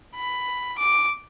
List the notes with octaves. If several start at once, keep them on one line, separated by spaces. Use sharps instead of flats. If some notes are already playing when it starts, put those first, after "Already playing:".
B5
D6